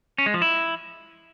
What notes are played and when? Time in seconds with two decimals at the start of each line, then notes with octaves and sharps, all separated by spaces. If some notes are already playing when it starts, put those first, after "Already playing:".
0.18 C#4
0.26 G#3
0.34 F3
0.42 E4